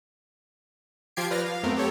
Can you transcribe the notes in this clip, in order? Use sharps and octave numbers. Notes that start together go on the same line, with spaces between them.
F3 F4 G4 G#6 C7 D7
F3 B4 D5 F6 A#6
F5
F#2 A3 B3 C4 A#4
C4 G4 A4 C#5